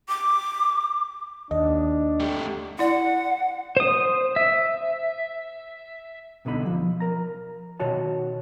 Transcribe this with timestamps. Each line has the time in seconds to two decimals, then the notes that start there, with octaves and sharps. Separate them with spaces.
0.09 D6
1.51 D#2 D4 D#5
2.20 A3 G4
2.79 E4 D5 F#5
3.77 C5 D#6
4.36 E5
6.45 C2 B2 D3 D#4 B5
6.66 F3
7.00 A#4 A#5
7.80 B2 D#3 F#4 C#5 A5